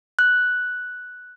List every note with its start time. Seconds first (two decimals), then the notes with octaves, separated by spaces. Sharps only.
0.19 F#6